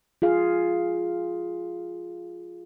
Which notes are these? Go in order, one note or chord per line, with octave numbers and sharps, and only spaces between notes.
F4 G#4 F5